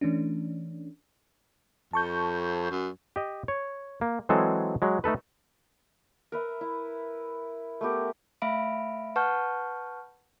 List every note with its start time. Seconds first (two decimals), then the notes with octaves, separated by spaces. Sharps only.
0.01 E3 A3 C#4 D4
1.93 F2 A5 C#6 G6
2.71 F#2
3.16 G4 D#5
3.48 C#5
4.01 A#3
4.29 E3 F#3 G#3 C4 G#4 A4
4.82 F#3 G#3
5.04 A3 D#4 A4 B4
6.32 A#4 B4 E5
6.61 E4
7.81 A3 B3 G4 A#4
8.42 A3 E5 F5 B5 D7
9.16 B4 F#5 A5 C#6 F6 G6